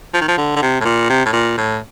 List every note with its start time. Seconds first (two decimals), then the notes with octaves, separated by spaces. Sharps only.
0.14 F3
0.21 D#3
0.28 F3
0.38 D3
0.56 D3
0.62 C3
0.81 A2
0.85 A#2
1.09 C3
1.25 A2
1.33 A#2
1.57 A2